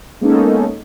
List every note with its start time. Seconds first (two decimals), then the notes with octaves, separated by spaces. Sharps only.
0.21 G#3 A#3 B3 C#4 D#4 A4